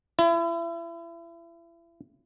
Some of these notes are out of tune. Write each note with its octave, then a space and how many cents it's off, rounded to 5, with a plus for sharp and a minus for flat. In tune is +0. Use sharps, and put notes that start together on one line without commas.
E4 +35